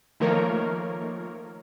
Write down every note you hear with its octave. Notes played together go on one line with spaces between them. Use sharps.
D#3 F3 A3 A#3 A#4 C#5